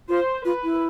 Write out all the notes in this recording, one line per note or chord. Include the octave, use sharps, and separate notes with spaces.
F4 C5
F4 B4
E4